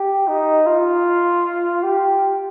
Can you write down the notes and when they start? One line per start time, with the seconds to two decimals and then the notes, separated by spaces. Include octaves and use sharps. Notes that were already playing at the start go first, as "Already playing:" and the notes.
Already playing: G4
0.28 D#4
0.67 F4
1.83 G4